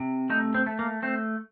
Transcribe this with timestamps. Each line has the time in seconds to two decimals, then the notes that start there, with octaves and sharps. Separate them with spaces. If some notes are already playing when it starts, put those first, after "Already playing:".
Already playing: C3
0.30 A3 D#4
0.54 C4
0.67 A3
0.79 A#3
1.02 A3 C4